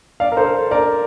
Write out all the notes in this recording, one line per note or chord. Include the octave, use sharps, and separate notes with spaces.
D5 F5
A#4
A4 C5
A#4 D5